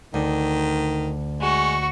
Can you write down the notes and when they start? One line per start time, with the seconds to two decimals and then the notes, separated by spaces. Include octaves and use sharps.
0.14 D2 D#3
1.41 G#3 F#4 C#6